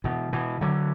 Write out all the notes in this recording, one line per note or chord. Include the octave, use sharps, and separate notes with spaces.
B2 E3
B2 E3
D3 F#3